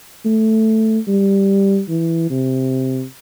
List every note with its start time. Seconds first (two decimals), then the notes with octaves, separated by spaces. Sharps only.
0.25 A3
1.08 G3
1.89 E3
2.30 C3